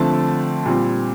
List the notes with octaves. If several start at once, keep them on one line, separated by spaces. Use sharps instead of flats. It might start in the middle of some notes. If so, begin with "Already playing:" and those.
Already playing: D3 F3 A3 C4 A5
A#2 G3 C4